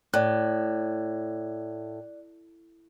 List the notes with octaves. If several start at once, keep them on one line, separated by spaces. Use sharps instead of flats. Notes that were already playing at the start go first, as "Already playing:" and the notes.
A2 D5 F#6